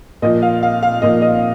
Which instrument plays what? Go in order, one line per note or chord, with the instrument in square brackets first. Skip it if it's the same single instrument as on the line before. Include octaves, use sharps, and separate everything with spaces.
[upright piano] A#2 F3 D#5
F5
F5
F5
A#2 F3 D#5
D#5